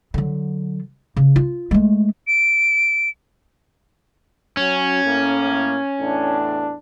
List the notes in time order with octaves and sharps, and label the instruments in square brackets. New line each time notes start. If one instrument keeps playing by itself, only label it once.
[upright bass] D3 F#3
C#3
F4
G#3 A3
[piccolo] D7
[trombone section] F#3 [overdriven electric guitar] C#4
[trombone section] A2 A#3
E2 A2 D4